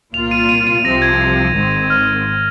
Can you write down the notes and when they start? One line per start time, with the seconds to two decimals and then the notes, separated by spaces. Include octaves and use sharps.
0.14 C2 A#2 A#3 F4 F7
0.31 D#7
0.49 D#7
0.67 D#7
0.84 C2 C3 F3 C4 A#6
1.02 G#6
1.54 G#1 G#2 D#3 C4
1.90 F6